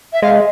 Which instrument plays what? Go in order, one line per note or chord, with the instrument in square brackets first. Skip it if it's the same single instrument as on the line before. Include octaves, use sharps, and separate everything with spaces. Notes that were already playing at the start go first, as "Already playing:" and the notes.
[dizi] E5
[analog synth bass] G#3 [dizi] F5